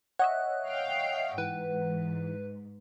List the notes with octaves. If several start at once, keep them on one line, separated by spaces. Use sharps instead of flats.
C#5 D#5 E5 F#5 F#6
F5 G5
G#2 E3 B4